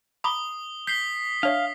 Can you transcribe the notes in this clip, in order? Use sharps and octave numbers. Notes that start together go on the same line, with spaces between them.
A#5 B5 D6 D#6 G7
G6 B6 C7 G7
D4 C#5 E5 F5